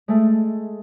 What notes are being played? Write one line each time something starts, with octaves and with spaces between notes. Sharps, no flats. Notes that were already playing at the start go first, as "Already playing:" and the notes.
G#3 A3